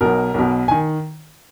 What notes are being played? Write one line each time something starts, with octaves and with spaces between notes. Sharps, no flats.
B1 B2 A#4
B1 B2
G#5
D#3